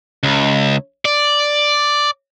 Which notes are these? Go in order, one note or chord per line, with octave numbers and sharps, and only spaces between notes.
C#2
D5